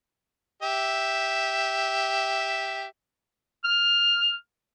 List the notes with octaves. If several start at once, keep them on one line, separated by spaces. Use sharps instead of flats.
G4 E5
F6